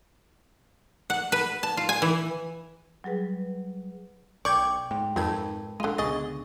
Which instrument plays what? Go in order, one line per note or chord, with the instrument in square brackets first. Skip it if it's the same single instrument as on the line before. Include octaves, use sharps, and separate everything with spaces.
[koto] F#5
B4
A5
F4
G#5
E3
[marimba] F#3 G3 G#4 B4
[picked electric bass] B1 [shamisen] D5 [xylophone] G5 D6 [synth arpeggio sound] C#6 G6 G#6
[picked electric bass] G#2 [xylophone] G5
[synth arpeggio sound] F2 G#6 [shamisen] C4 D#4 B4 [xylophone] A#4 A5
[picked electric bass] A#1 G#3 [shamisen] D3 F4 [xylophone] D#7 G7
[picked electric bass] C#2 B2 D3 [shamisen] G#4 D#5 [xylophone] C#6 [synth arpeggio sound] A6